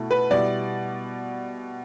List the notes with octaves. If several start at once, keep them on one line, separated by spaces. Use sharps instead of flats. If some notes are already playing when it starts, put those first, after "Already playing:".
Already playing: B2 A3 E4
B4
B2 G3 B3 E4 D5